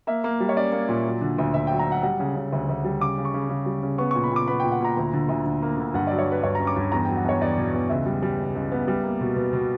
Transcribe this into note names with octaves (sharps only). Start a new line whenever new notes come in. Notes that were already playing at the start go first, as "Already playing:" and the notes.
A#3 E5
A#3
G3
C#5
C#4 D5
A#3
A#2
F#3
D3
D2
D2 E5
G5
F#3
A#5
F#3 F#5
G3 F#5
C#3
C#3
D2
D2
G3
C#3 D6
C#3
C#6
C#3
C#3
G3
C#3
B3 C#6
C#6
A#2
B5
A#2 D6
B3 B5
G5
A#2
F#5
A#2 A#5
D2
D3
D2
D3
A#3
D3
G2 F#5
D5
F#3
C#5
F#3
B4
G2 C#5
A#5
C#4
D6
G2
E2 A#5
G5
F#3
F#5
E2 C#5
E2 D5
B2
E2
C#2 E5
G3
G3
C#2
C#2
B3
G3
A#3
B2
B2
B2